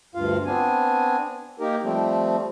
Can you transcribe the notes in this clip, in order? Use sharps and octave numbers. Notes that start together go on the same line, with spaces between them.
D2 G2 F4 F5
B3 C4 D4 G#5
A#3 D#4 G4 A#4
F3 G3 A3 C4